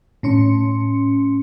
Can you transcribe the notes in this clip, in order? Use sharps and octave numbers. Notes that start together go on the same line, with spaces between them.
A2 C#4 C6 C#7